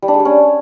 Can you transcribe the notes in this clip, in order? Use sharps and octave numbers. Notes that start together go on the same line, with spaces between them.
G3
D4
G#3
G3
C#4